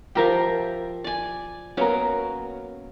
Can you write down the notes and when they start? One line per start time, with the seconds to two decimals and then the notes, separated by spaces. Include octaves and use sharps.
0.15 F3 G4 A#4 E5 G5
1.04 D5 G#5
1.77 F#3 A#3 B3 C#4 A#4